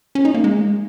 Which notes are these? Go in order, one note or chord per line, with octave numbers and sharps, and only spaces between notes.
C#4
D#4
A#3
G#3